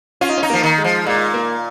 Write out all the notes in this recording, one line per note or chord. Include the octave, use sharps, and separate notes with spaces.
C#4 F4
D#4
C#4
D#4
F3 A#3
D#3
G#3
F3
A#2 G#3
A#3